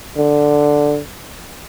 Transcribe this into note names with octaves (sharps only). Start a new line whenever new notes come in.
D3